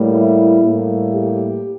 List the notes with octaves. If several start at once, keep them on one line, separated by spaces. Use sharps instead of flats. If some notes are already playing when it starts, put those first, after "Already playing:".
Already playing: A2 G3 A#3
E4
A2 G3 A#3
G4